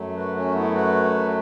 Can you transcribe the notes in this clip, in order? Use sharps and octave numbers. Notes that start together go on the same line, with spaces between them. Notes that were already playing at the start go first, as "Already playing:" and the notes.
Already playing: F#2 F#3 A3
F#4 B4
C#4 F#4
B3 E4
F#4 B4